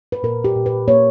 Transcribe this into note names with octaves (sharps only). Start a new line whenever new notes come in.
B4
A#2 A#4
G4
A#2
B4
A#3 C#5